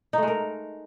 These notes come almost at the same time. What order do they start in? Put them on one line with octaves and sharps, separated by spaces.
D#4 A3 G#3 A#4